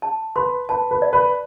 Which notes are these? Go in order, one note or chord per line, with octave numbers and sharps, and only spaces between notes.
A5
B4 C6
B4 A5
B4
D5
B4